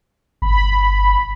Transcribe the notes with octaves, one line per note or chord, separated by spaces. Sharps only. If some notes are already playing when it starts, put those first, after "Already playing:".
G1 B5